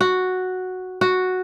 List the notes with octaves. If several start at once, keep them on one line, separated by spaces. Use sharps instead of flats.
F#4
F#4